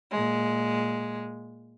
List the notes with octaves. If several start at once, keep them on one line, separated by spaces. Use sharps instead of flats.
A#2 G#3